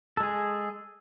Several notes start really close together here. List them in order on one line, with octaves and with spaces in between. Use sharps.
A4 G#3 G#4